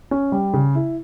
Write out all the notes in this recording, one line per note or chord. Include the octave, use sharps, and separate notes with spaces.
C#4
G3
C#3
E4